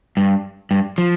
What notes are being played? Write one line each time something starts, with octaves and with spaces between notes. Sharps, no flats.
G2
G2
F3